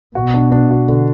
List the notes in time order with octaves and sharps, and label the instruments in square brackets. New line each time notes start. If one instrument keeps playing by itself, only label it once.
[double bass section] B2 [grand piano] F#4
[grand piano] D4
D4
F#4
D3